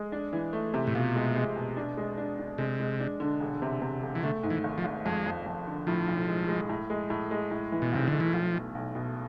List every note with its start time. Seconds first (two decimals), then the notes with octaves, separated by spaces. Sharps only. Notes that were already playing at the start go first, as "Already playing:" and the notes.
Already playing: G#3
0.12 D4
0.33 E3
0.53 A3
0.74 C3
0.87 A2
0.95 B2 F4
1.16 G#3
1.35 G#3
1.56 B2
1.77 D4
1.97 G#3
2.18 D4
2.39 D4
2.58 C3 G#3
2.80 G#3
3.00 D4
3.20 D3
3.40 E1
3.62 C3
3.82 C3
4.03 E1
4.15 E3
4.23 D3 A3
4.43 G#2
4.50 E3
4.64 G#1
4.78 F3
4.84 G#1
5.05 F2 G#3
5.26 F2
5.46 F2
5.67 D3
5.87 A2 F3
6.07 B1
6.28 G#3
6.49 G#3
6.69 A2
6.90 G#3
7.10 A2
7.31 G#3
7.51 A2
7.72 E3
7.82 B2
7.92 B1 C3
8.08 D3
8.13 A3
8.20 E3
8.33 B1 F3
8.54 B2
8.75 B1
8.95 B2